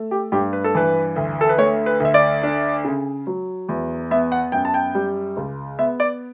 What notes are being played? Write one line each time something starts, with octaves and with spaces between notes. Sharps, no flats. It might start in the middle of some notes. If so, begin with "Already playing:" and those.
Already playing: A3
G4
G2 G4
B4
A4
E3 B4
D2
A4
B4
A3 C#5
B4
D2 E5
D5
D4
C#3
F#3
E2
B3 E5
F#5
F#2 G5
A5
G5
G3
C#2
B3 E5
D5